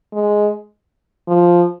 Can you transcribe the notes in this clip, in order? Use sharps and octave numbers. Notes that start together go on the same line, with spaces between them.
G#3
F3